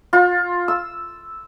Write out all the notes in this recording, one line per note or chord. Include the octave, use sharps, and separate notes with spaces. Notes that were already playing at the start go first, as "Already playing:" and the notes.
F4
E6